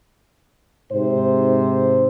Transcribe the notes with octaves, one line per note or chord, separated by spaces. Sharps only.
G#2 C3 C5